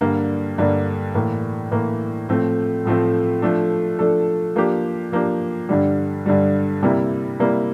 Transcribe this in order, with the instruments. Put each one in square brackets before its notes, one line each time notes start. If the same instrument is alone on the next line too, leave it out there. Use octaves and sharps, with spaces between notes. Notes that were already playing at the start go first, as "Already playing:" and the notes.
[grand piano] G2 D3 G3 A#3
G2 D3 G3 A#3
A2 E3 A#3
A2 E3 A#3
A2 F3 A3 C4
A2 F3 A3 C4
F3 A3 D4 A4
F3 A3 D4 A4
F3 A#3 D4 G4
F3 A#3 D4 G4
G2 D3 G3
G2 D3 G3
C3 G3 A#3 E4
C3 G3 A#3 E4